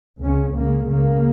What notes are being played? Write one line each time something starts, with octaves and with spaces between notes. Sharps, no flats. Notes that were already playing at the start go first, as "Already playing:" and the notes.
C#2 C#3 C#4
C#2 C#3 A#3
C#2 C#3 A#3